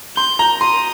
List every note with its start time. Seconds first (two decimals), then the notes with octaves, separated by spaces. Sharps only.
0.16 C6 G6
0.39 A#5
0.61 C6 D#6